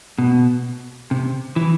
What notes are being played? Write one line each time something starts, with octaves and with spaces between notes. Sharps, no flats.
B2
C3
E3